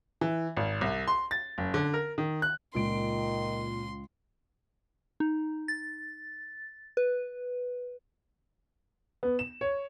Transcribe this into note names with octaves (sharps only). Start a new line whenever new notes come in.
E3
G#1
C2
C6
A6
F#1
D3
A#4
D#3
F#6
C#2 A#2 D#3 C6 D7
D#4
A6
B4
B3
E7
C#5